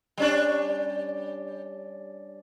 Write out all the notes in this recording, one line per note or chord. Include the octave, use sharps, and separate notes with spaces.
G3 C#4 D4